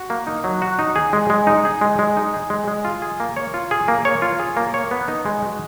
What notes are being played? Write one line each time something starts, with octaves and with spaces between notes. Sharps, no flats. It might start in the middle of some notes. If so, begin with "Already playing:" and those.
Already playing: F#4
A#3
D#4
F#3
F#4
D#4
G#4
G#3
G#3
D#4
G#4
G#3
G#3
D#4
G#4
G#3
G#3
F4
G#4
A#3
C#5
F4
G#4
A#3
C#5
F4
G#4
A#3
C#5
B3
D#4
G#3
F#4